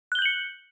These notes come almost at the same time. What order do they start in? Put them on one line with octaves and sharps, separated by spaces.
F#6 G7 G6 F#7 C#7